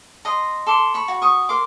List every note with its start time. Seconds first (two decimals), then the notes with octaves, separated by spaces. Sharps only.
0.25 D#5 A#5 C6
0.66 A4 C6 D6
0.94 B5 C#6
1.08 F#4
1.22 C#6 D#6
1.49 A#4 C6 D6